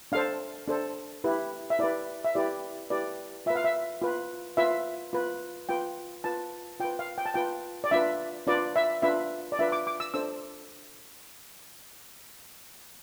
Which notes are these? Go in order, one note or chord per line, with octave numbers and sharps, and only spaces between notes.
D4 A4 C5 F5
D4 A4 C5
E4 G4 B4
E5
E4 G4 B4 D5
E5
E4 G4 B4 D5
E4 G4 B4 D5
F4 B4 E5
F5
E5
F4 B4
F4 B4 E5
F4 B4
F4 B4 G5
F4 B4 A5
F4 B4 G5
F5
G5
A5
F4 B4 G5
D5
D4 F4 B4 E5
D4 F4 B4 D5
E5
D4 F4 B4 E5
D5
D4 F4 B4 E5
D6
D6
E6
D4 A4 C5 E6